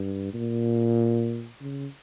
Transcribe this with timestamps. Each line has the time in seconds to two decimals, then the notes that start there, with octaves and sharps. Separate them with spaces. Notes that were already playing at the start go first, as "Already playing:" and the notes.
Already playing: G2
0.34 A#2
1.61 C#3